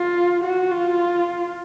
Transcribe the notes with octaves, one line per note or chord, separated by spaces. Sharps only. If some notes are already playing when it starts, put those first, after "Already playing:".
Already playing: F4
F#4
F4